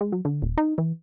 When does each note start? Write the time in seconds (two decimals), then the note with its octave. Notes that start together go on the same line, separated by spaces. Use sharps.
0.01 G#3
0.12 F#3
0.25 D3
0.42 D#1
0.58 D#4
0.78 E3